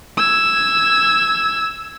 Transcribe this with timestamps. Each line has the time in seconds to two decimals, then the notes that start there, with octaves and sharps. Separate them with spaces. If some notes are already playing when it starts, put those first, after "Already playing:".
0.17 E6 G#6